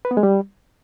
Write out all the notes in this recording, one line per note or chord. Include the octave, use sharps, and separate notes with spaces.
B4
B3
G#3
G3